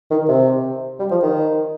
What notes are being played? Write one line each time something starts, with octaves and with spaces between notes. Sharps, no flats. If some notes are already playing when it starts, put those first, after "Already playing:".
D#3
C3
G3
F3
D#3